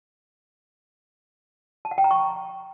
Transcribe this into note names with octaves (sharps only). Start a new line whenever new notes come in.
A5
F#5
G5
A#5
C#6